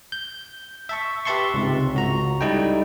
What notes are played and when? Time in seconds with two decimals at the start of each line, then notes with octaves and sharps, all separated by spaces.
0.12 G6
0.89 E5 A5 C#6
1.25 G4 B4 E5 A5 C6 C#6
1.54 C#2 G#2 C3
1.94 C#2 F#4 A#5
2.41 G3 D#4 E4 A4 G5